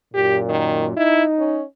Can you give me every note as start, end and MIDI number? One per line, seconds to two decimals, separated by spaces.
0.14 0.96 42
0.14 0.96 46
0.14 0.38 67
0.49 0.86 51
0.97 1.61 63
0.97 1.24 64
1.39 1.64 61